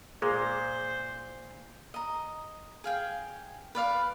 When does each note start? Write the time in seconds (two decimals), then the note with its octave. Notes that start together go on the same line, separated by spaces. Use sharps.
0.22 A#2 G#3 G#4 C5
1.94 D#5 A#5
2.84 G#4 F5 G5
3.75 B4 D5 F5